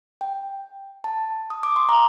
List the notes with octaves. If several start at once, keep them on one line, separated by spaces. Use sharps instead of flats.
G5
A5
D#6
D6
C6
A#5